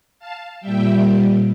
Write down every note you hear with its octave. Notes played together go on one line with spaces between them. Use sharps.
F5 A5
A#2 G3 E5 G5